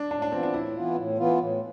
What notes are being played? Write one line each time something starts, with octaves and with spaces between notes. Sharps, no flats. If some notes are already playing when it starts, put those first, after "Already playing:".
Already playing: D4
A2 D4
D4
E3 B3 C4 F4
D4
A2 E4
E3 B3 F4
A2
E3 B3 F4
A2